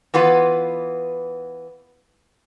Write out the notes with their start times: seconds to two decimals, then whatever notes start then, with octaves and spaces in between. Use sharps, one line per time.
0.14 E3 B3 F4 B4